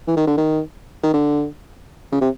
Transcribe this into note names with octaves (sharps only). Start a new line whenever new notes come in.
E3
D#3
D3
D#3
D#3
D3
C#3
C3